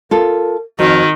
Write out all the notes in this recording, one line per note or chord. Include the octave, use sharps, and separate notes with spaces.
F4 A4 A#4
F2 D#3 F#4